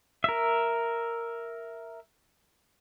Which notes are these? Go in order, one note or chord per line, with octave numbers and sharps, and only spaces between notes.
A#4 E5